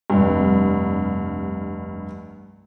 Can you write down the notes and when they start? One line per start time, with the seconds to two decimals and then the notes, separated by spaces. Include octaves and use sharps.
0.10 F1 C2 G2